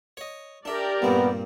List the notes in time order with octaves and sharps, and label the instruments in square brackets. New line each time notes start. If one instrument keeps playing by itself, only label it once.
[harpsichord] C#5 D#5
[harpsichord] D4 E5 [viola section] G4 A#4 D5
[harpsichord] G2 A#2 C4 [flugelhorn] B3